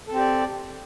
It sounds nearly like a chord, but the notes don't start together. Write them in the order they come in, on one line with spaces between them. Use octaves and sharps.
A4 C4 G4 D5